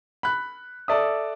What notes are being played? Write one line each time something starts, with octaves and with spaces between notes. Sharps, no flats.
B5 F#6
A4 D5 E5 D#6